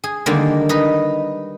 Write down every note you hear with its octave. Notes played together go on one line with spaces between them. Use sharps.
G#4
D3 D#3 G3 G#3 A#3
D#4 B4 D#5